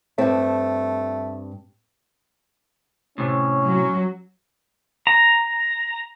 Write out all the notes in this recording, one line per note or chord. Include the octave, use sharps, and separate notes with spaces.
G2 A3 C4
A2 C3 C#4
F#3
A#5